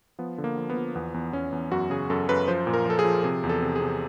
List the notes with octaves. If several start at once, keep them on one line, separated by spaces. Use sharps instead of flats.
F3 B3
D3
A#3
F3
B3
F3
E2 B3
E2
E2 C#4
E2
F#2 F#4
C#3 G#4
F#2 A4
F#2 B4
F3 C5
A#2
A#4
F3 A4
G#4
F3
C3 G#4
E2
A4
C3
G#4
C3